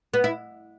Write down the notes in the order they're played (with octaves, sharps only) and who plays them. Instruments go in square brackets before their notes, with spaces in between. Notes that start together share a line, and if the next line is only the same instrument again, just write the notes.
[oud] B3
E4